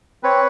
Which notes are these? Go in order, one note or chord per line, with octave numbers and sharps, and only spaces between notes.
C4 B4 C#5